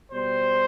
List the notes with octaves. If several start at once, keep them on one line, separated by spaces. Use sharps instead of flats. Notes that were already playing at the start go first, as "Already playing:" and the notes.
B2 G3 C5